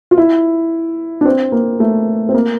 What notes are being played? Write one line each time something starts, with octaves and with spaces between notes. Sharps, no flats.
F4
E4
D4
C4
A#3
A3
C4
A#3